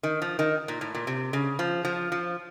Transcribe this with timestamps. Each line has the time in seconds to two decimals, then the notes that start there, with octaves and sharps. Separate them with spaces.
0.03 D#3
0.22 F3
0.39 D#3
0.68 A#2
0.81 A2
0.95 A#2
1.07 C3
1.33 C#3
1.59 F3
1.85 F3
2.12 F3